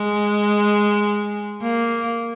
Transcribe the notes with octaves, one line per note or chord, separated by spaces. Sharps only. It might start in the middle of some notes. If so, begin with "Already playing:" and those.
Already playing: G#3
A#3